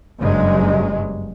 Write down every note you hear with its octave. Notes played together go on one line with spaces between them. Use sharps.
F#1 G2 F#3 G#3